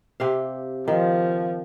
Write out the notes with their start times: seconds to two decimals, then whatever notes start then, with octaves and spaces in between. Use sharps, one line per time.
0.20 C3 G4 F5
0.88 D#3 F3